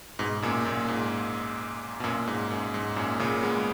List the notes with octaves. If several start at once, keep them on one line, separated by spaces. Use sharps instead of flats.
G#2 B2
F#2 A#2
F#2 A#2
G#2
B2
F#2 A#2
G#2
F#2
G#2
F#2 A#2
A#2 C#3
G#3 B3